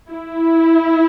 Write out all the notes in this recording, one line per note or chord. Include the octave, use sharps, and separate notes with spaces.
E4